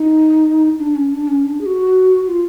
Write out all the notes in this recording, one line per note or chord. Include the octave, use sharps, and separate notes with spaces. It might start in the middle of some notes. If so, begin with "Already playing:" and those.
Already playing: D#4
D4
C#4
D4
C#4
D4
G#4
F#4
F4